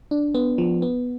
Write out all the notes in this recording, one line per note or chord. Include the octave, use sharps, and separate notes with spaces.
D4
B3
F3
B3